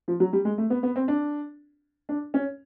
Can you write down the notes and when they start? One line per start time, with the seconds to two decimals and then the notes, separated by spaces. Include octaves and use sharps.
0.08 F3
0.20 F#3
0.33 G3
0.45 G#3
0.58 A3
0.70 B3
0.83 B3
0.96 C4
1.08 D4
2.09 D4
2.34 C#4